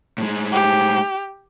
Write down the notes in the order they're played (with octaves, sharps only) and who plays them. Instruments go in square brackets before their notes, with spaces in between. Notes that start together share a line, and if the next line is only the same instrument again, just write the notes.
[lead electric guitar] A2 G#3
[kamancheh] G4